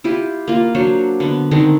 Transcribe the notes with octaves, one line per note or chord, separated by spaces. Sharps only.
E4 F4 G4
A#3 F4
F#3 D4 C5 C#5
D3 B3
D3 D#3 G#3 C4